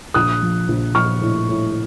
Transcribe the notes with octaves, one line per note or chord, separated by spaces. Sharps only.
A#1 D#6 F#6
F3
A#1
A#1 C#6 F6
A2
A2